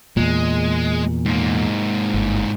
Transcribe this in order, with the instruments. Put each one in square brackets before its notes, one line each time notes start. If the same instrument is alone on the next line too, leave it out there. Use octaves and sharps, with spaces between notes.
[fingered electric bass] E2 A#2 [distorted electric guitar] G#3
[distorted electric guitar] G#2 A#3
[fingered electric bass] G1